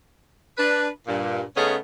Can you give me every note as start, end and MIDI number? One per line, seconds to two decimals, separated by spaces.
0.58 0.88 62
0.58 0.88 71
1.07 1.43 43
1.07 1.43 46
1.57 1.76 49
1.57 1.76 57
1.57 1.76 59
1.57 1.76 61
1.57 1.76 63
1.57 1.76 68